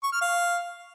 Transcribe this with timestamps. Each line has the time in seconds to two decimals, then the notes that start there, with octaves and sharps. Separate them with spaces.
0.03 C#6
0.12 F6
0.21 F5